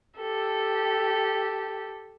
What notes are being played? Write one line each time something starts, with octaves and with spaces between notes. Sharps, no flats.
G4 A4